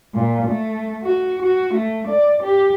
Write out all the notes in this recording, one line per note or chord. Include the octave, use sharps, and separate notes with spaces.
A#2
A3
F#4
F#4
A3
D5
G4